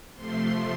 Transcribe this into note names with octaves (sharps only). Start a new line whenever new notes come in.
C3 F3 A3 C6